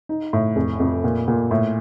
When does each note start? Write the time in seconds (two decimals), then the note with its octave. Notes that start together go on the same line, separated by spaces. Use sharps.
0.09 D#4
0.33 A2
0.56 F1
0.80 F2
1.04 A#2
1.28 A#2
1.51 A2